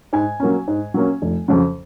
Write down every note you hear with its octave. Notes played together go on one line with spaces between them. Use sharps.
G#2 G#5
F#3 A#3 C#4
G#2
F#3 A#3 C#4
F1
F2 C#3 F#3 C#4